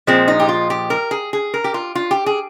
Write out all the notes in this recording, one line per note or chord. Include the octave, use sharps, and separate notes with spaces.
A#2 F3 G#3 C4
D#4
G4
F4
G4
A#4
G#4
G#4
A#4
G4
F4
F4
G4
G#4